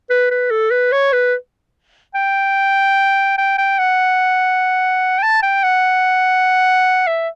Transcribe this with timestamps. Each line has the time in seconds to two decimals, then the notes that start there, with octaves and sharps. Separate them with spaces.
0.10 B4
0.31 B4
0.51 A4
0.71 B4
0.92 C#5
1.13 B4
2.15 G5
3.38 G5
3.58 G5
3.78 F#5
5.18 G5
5.23 A5
5.43 G5
5.64 F#5
7.07 E5